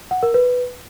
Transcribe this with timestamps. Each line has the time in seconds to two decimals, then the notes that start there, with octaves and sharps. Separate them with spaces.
0.11 F#5
0.23 A#4
0.34 B4